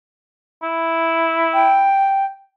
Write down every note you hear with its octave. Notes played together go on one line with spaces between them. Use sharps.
E4
G5